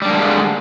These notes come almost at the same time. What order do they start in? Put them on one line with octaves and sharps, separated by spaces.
G3 D4 A#3 D3 G#3